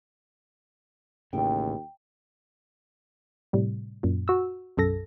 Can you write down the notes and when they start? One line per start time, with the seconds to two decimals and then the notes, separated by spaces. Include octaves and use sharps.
1.33 A1 D#2 A2 C#3 G5
3.53 A2 C3 G3
4.03 F#2 A#2
4.28 F#4 E6
4.77 B1 F#2 A4 A#6